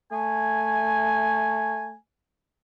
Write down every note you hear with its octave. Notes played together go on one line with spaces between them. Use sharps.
A3 G#5